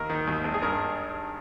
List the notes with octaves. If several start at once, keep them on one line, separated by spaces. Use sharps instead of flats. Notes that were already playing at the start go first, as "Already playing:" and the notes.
Already playing: D#2 A#4
D#3
D#2
G#1
G#4
G2 A#4